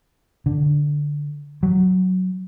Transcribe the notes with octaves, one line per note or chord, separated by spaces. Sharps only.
D3
F#3